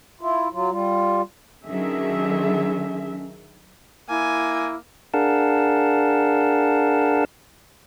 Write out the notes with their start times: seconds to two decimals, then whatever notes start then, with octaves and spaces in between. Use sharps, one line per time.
0.21 E4 F4
0.53 F#3 F4
0.71 G3 F4
1.66 D3 D#3 F#3 C#4 G#4 E5
4.09 A#3 E4 G#5
5.14 D4 G#4 A#4 F5 F#5 A5